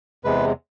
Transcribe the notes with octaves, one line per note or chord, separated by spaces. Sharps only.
E2 C3 G#3 B4